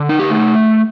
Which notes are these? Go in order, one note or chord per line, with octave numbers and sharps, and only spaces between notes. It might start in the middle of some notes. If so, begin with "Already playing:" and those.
Already playing: D3
D#4
G4
A3